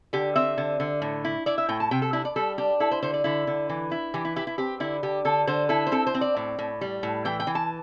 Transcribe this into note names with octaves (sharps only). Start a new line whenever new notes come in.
D3 G4
C4 E5
D3
D3
A2
E4
E4 D5
E5
A2 G5
A5
C3 G5
A4
D4 E4
D5
G3 A4
D4 G4
E4 A4
C5
D3 C5
D5
D3 E4
D3
E3
E4
E3 G4
E4
E4 G4
E4
C4 G4
D3 E4
D3 G4
D3 A4
D3 C5
E4 A4
C5
C4 A4
C5
C4
D5
A2
A2
G3
A2
E3 G5
G5
E3
A5